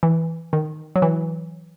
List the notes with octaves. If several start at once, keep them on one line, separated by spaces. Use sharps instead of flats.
E3
D#3
F#3
E3